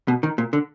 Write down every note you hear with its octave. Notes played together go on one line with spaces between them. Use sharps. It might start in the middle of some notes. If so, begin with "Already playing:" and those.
B2
D#3
A#2
D3